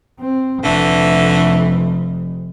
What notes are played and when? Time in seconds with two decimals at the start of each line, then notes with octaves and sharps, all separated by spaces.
0.20 C4
0.64 F1 D3 E3 A3